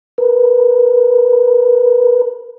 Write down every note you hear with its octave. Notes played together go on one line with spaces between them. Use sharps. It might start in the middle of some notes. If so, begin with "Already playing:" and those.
A#4 B4